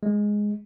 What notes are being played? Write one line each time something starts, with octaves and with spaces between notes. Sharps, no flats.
G#3